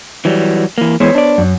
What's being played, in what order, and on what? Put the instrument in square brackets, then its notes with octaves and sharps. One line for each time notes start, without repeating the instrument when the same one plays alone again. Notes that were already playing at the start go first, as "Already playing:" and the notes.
[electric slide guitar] E3 F#3 G3
E3 A#3
[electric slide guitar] E3 G#3 [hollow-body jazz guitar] B3 C5 C#5
[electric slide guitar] D4 D5
[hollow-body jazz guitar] F#2